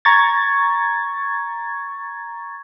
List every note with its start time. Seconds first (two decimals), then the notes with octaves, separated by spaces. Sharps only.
0.05 A#5 C#6 G#6 A6